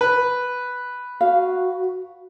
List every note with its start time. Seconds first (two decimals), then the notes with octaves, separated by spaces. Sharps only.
0.01 B4
1.21 F#4 F5